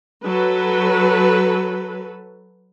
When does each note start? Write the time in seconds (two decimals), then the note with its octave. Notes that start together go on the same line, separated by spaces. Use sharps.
0.24 F#3 A4 B4